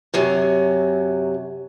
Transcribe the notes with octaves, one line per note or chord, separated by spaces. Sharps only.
F#2 C3 F#3